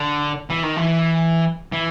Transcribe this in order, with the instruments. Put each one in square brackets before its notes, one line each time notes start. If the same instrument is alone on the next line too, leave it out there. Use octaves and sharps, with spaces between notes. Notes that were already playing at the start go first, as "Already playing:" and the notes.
Already playing: [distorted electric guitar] D3
E3
D#3
E3
E3